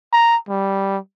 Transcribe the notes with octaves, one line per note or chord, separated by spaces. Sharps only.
A#5
G3